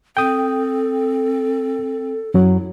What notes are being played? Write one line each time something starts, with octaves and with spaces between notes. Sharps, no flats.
C4 A4 G5 D#6
F#2 F#3 E4